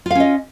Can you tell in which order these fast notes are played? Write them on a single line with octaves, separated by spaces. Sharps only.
F4 F5 C#4 D#5